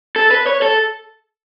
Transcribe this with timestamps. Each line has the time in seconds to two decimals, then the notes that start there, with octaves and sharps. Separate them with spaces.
0.16 A4
0.31 B4
0.46 C#5
0.62 A4